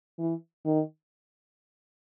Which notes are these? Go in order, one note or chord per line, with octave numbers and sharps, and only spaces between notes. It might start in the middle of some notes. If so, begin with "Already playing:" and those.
E3
D#3